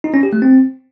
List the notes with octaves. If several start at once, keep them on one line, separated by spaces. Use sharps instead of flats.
D#4
C#4
G4
A3
C4